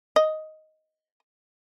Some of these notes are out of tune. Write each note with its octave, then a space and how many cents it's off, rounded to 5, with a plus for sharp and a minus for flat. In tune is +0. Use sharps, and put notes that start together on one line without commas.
D#5 +5